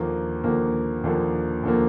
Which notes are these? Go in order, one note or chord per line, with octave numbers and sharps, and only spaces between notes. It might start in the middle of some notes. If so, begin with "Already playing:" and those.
Already playing: D#2 D3 F3 A#3
D#2 D3 F3 A#3
D#2 D3 F3 A#3
D#2 D3 F3 A#3